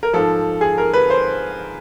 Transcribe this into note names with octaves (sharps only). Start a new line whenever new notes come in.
A#4
G#2 F3 A4
G#4
A#4
B4
C5